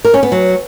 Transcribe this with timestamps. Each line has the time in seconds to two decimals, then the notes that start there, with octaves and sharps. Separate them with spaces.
0.05 A#4
0.14 C#4
0.23 B3
0.32 F#3